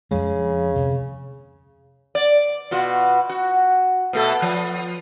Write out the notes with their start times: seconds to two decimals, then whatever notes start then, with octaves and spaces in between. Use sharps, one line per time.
0.11 F2 C#3 F3 G#3
0.75 D2 C3
2.15 D5
2.71 B2 F4 F#4
3.29 F#4
4.13 B2 A3 A4
4.42 F3